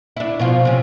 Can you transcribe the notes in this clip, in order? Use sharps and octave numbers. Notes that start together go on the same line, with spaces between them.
D4 E4
B2 F3 F4
C3 C#4